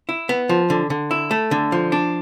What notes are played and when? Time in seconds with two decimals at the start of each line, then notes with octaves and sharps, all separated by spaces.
0.09 E4
0.29 B3
0.49 F3
0.70 D3
0.90 D3
1.11 E4
1.31 A3
1.51 D3
1.72 F3
1.92 D4